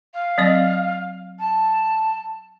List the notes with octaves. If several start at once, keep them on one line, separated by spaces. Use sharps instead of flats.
F5
F#3 C4 D#5
A5